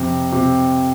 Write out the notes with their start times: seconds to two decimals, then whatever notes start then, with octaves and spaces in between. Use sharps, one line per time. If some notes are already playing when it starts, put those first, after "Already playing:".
Already playing: F2 C3
0.32 C3